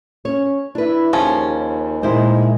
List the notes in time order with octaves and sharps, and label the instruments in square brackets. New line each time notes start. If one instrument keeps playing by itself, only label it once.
[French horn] C#4 [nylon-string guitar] C#5
[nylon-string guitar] D4 B4 [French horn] E4
[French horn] D#2 [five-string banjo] F3 C#4 [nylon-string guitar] G#4
[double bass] A#2 G#3 [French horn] D#3 [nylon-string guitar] E4 C5